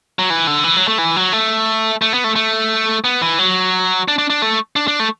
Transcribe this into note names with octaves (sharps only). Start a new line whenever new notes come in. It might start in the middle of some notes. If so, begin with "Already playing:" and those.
F#3
E3
D3
E3
F#3
A3
E3
F#3
A3
A3
B3
A3
A3
B3
E3
F#3
D4
D4
D4
A3
D4
D4
A3